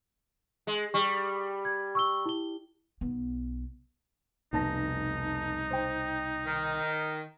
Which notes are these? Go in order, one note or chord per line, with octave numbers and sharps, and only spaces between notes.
G#3
G3 C#6
G#6
C#6 E6 G7
E4 G7
B1 B3
F1 C2 B2 D#4 A5 A#6
C5 G5
D#3